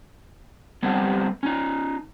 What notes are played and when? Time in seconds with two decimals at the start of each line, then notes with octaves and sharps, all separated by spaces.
0.83 G3 B3 C4 A4
1.43 C#4 D#4